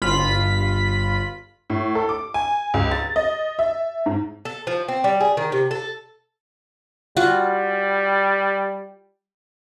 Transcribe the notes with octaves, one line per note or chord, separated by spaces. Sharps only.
G1 F4 B5 B6
A2
A4
D6
G#5
C#2
A6
D#5
E5
G#2
A4
F3
C4
G3
G#4
D#3
C3
A4
G3 F4 F#4 F#5